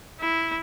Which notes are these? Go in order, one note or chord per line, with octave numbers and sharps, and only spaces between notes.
E4